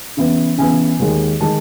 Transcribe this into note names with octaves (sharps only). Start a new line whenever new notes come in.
C#3 E3 B3
C#3 E3 B3 G#5
D#2 D#3 G#3
D#3 G#3 A5